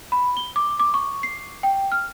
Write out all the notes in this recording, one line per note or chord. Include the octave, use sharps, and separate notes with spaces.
B5
G7
D6
D6
C#6
C7
G5
F6